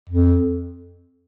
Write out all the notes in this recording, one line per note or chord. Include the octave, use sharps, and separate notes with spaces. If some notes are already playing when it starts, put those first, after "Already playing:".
F2